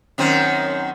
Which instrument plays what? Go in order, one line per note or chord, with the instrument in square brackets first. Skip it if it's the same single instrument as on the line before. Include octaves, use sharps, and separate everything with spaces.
[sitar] F#2 D#3 C4